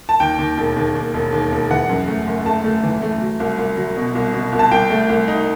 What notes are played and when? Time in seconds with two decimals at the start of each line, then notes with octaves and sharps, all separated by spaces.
0.09 A5
0.20 D#2 G5
0.38 D#2
0.58 E1
0.76 D#2
0.95 D#2
1.14 E1
1.32 D#2
1.52 E1
1.70 E3 F#5
1.89 F#2
2.07 A3
2.27 F#1
2.46 A3 A5
2.64 A3
2.83 E3
3.02 A3
3.21 F#3
3.40 C2
3.58 C2
3.77 F#3
3.97 B2
4.15 C2
4.33 B2
4.52 C2
4.59 A5
4.71 C2 G5
4.90 A3
5.09 C2
5.28 D#4